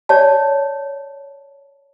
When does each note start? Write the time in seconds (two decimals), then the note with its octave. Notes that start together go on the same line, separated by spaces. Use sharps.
0.09 C#5 D5 A5